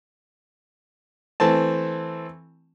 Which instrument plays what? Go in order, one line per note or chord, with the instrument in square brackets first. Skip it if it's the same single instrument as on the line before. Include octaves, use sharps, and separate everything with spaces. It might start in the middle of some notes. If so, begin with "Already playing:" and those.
[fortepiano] E3 A3 C4 A5